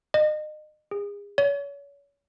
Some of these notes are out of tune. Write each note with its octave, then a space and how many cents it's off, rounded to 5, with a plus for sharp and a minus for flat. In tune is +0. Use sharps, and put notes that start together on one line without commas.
D#5 -30
G#4 -35
C#5 +35